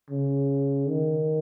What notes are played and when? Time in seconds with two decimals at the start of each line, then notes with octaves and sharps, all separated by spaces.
0.10 C#3
0.89 D#3